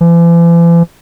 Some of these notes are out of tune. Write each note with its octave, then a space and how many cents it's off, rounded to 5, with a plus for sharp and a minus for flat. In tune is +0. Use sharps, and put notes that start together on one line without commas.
E3 +45